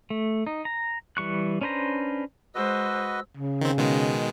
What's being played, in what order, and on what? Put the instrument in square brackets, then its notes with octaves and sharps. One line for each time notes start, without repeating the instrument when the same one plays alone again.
[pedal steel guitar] A3
D#4
A#5
E3 G3 C#6 F#6
C#4 D4 B4 C5 A#5
[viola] G#3 C5 [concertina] F#4 B4 D#5 [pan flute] E6
[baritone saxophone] C#3
[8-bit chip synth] D#3 C4
B2 D#3 G#3